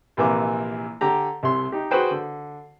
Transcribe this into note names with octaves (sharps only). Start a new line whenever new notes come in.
A#1 C3 E3 A#3 D6
D3 G4 A#5
C2 C3 C6
D#4 G4
F#4 G#4 B4 C5 G5
D3